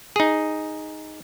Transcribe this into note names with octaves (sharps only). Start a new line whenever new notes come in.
D#4 G#4